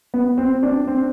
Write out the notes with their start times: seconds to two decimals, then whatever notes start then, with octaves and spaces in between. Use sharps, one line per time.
0.14 B3
0.38 C4
0.63 D4
0.87 C4